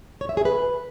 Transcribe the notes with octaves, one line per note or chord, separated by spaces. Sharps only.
C#5
E5
G#4
B4